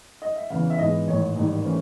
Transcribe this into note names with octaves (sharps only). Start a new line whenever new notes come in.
D#5
E5
E2 C#3 E3 F5
E5
G#2 E3 G#3 B3 D#5
A1 G#2 D#3 C#5
A1 G#2 D#3 G3 A#3
E3 A3 C#4 C5